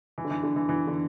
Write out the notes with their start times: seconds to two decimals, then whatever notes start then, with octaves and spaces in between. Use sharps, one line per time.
0.18 E3
0.25 D3
0.31 E3
0.43 D3
0.56 E3
0.69 E3
0.87 D3